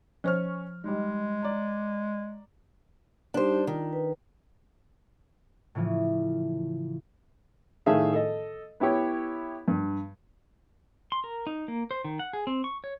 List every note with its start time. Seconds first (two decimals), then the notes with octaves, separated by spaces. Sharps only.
0.24 F3 C#4 C5 C#6 F6
0.84 G3 G#3 D#4
1.42 D5 A#5
3.34 G3 D4 D#4 G4 C5
3.67 D#3 F4
3.93 B4
5.75 A2 C#3 E3 F3
7.86 A2 D#3 G#4 E5 F5
8.13 A4 D#5
8.80 B3 E4 G4 C#5
9.68 G2
11.12 C6
11.24 A#4
11.47 D#4
11.68 A#3
11.91 C5
12.04 D#3
12.19 F#5
12.33 G#4
12.47 C4
12.64 C#6
12.84 C#5